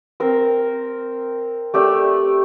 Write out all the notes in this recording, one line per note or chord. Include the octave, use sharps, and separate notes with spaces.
C4 A#4 C5
A3 G4 D5 E5